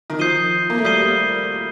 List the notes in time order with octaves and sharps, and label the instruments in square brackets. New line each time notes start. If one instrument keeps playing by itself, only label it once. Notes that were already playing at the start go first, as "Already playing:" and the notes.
[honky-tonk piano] D#3
[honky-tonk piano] F3 [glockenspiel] D#6 G6 C7 D#7 G7
[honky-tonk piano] A#3
A3
[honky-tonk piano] G3 [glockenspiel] D#6 G6 C7 D#7 G7